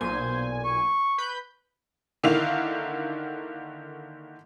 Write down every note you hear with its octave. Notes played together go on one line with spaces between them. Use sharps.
B1 A#2 C5 G#5
C#6
B4 B5 G6
D3 D#3 A#3 E4 F5 F7